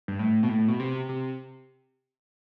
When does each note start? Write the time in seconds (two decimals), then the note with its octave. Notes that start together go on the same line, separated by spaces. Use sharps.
0.08 G2
0.19 A2
0.43 B2
0.49 A2
0.68 B2
0.80 C3
1.09 C3